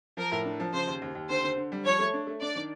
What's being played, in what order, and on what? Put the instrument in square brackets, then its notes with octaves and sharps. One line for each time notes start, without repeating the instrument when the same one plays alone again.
[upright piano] F3 [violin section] A#4
[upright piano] A2
D4
F3
[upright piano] C#3 [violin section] C5
[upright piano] D#2
D#2
D#2
[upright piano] D3 [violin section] C5
[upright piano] D3
D3
G3
[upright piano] F3 [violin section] C#5
[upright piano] A3
D4
A3
[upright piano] D4 [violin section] D5
[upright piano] D#3